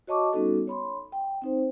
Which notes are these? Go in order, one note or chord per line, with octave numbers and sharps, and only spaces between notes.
F#4 C#5 D#5 A5 C#6 D6
G3 B3 C#4 D#4 F#4 A4
C#5 B5 C6
G5
C4 D#4 C5